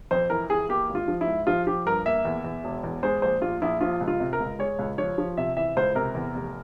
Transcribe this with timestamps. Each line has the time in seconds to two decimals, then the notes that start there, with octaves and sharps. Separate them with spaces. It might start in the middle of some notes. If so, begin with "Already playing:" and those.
0.11 F2 C5
0.30 E3 A#4
0.49 E3 G#4
0.69 A#3 G4
0.89 G#1
0.95 F4
1.08 F3
1.21 E4
1.27 G#2
1.47 F3 F4
1.67 F3 G4
1.86 G2 A#4
2.06 A#3 E5
2.25 E2
2.44 E2
2.64 E1
2.84 E2
3.03 G#3 C5
3.22 A#1 C5
3.42 A#1 F4
3.62 A#1 E4
3.81 F3 F4
4.01 C#2
4.08 F4
4.20 C3
4.33 A#4
4.40 C#2
4.59 G#3 C#5
4.79 C#2
4.98 F3 C#5
5.18 F3
5.37 C3 E5
5.57 E3 E5
5.77 C#2 C5
5.95 C3 A#4
6.15 E2
6.35 F1